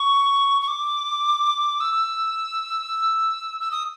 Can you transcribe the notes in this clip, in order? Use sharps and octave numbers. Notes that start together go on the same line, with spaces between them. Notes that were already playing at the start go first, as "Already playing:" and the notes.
Already playing: C#6
C#6
D6
E6
E6
D#6